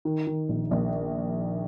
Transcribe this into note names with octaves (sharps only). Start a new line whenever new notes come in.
D#3
D#3
A#1
A#1